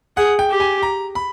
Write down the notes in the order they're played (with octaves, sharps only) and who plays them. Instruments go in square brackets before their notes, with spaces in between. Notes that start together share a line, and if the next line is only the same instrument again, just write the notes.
[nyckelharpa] G#4 [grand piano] F#5
[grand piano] G5
[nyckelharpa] G4
[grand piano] G#5
A#5
B5